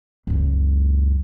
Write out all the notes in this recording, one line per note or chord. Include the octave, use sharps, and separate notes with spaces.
C#2 F#2